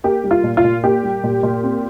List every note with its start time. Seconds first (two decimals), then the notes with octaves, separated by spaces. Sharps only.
0.04 A#3 G4
0.24 G3
0.31 F4
0.44 A#2
0.57 F4
0.64 A#2
0.84 A#3 G4
1.03 G3
1.24 A#2
1.43 A#2
1.63 C4